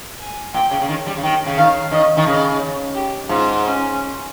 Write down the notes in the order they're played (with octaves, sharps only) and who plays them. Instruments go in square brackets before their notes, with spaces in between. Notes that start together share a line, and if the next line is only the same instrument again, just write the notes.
[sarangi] G#5
[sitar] A#2 [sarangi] G5
[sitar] C#3
C#3
D#3
G3
C#3
[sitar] D#3 [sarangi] G5
[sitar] C#3
[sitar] D#3 [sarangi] F5
[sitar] D#3 [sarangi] D#5
[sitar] D#3
[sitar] C#3 [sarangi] D#5
[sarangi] G4
[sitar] G#2 [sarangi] F4
[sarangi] C#4